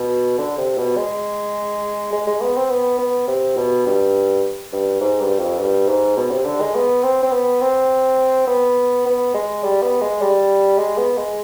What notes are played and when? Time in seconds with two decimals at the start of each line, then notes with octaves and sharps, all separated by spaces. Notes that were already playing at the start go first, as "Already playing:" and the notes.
Already playing: B2
0.38 D3
0.58 C3
0.78 B2
0.97 G#3
2.12 G#3
2.27 G#3
2.41 B3
2.56 C4
2.70 B3
2.98 B3
3.27 C3
3.57 B2
3.86 G2
4.72 G2
5.01 G#2
5.21 G2
5.39 F2
5.59 G2
5.88 G#2
6.17 B2
6.31 C3
6.45 D3
6.60 G#3
6.75 B3
7.03 C4
7.22 C4
7.31 B3
7.61 C4
8.47 B3
9.06 B3
9.34 G#3
9.64 G3
9.82 B3
10.02 G#3
10.21 G3
10.78 G#3
10.98 B3
11.18 G#3